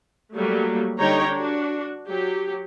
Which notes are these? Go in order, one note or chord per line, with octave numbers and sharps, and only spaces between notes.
F#3 G3 A3 A#3
D3 G3 D#4 C#5 G5 A#5
D4 F#4
F#3 G4